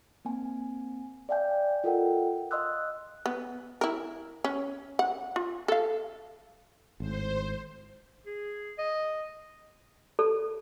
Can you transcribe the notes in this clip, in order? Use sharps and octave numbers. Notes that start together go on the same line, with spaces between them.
A#3 C4 G#5
D5 E5 F5 G5 G#5 G6
F4 A4 A#4 D#5 F#5 G5
D#5 F5 C6 D#6 E6 F#6
B3
E4 A#4
C#4
F#5
F4
A4 F5
G#1 A2 C5
G#4
D#5
A4